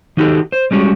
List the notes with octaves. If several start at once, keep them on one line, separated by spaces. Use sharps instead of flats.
D#3 D#4 F#4 G4 A4
C5
G3 G#3 C#4 F#4 G4